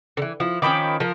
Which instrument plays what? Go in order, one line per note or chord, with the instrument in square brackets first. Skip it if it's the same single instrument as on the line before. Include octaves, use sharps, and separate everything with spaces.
[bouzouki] D3 E3
F3 E4
[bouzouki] D#3 F3 C#4 [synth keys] G5 B5 D6
[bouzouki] F3 A#4